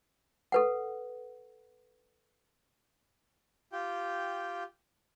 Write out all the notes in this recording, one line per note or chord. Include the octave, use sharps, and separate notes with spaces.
A4 B4 F#5
F4 G4 G5